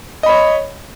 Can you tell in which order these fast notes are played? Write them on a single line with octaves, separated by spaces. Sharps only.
D#5 B5 C#5